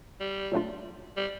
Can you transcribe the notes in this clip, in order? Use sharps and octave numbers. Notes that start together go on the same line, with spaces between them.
G3
A#2 F#3 A3 D4 F4
G3